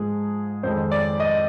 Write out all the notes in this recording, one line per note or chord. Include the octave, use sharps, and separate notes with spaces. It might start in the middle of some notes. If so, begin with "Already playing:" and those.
Already playing: G#2 F3 G#3 G#4
F2 D#3 G#3 C5
D5
D#5